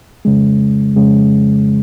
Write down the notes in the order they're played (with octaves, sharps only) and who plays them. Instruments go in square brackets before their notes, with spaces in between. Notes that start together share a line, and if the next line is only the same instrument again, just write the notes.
[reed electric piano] F2 C#3 G#3
F2 C#3 G#3